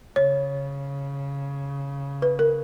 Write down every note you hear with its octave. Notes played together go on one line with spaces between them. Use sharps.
C#3 C#5
B4
A#4